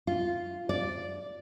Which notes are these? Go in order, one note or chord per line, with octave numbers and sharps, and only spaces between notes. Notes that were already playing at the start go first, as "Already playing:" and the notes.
F4
D5